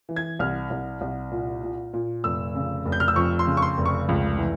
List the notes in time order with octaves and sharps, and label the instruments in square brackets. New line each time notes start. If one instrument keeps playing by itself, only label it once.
[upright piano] E3
G#6
C2 F6
C2
C2
A#2
A#2
A#2
F1 E6
C#3
F1
G6
F6
E6
F2 C#6
C6
C#3
C#6
C6
F1
C#6
C#2
E3